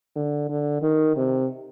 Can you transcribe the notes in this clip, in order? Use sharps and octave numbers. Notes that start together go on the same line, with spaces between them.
D3
D3
D#3
C3